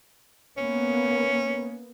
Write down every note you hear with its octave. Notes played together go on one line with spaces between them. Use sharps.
A#3 B3 C#4